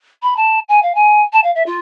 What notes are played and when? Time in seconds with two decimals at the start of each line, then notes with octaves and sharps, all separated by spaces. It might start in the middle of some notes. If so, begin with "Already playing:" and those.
0.22 B5
0.36 A5
0.68 G#5
0.82 F5
0.94 G#5
1.32 A5
1.43 F5
1.55 E5
1.66 F4